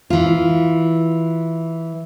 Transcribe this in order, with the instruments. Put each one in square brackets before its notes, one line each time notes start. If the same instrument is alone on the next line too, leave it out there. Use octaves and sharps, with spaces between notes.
[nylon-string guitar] E3 F4